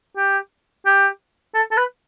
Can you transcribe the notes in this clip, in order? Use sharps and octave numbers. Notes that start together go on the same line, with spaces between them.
G4
G4
A4
A4
B4